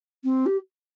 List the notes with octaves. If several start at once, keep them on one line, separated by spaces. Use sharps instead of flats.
C4
G4